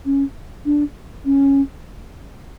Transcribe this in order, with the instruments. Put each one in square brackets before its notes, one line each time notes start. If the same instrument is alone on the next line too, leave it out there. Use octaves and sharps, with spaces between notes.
[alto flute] C#4
D4
C#4